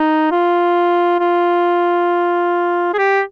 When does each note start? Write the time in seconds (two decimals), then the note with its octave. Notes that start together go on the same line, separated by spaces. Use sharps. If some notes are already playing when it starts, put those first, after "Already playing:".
Already playing: D#4
0.32 F4
1.20 F4
2.93 G#4
2.98 G4